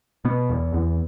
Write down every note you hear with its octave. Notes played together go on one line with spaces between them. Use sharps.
B2 B3
E2
E2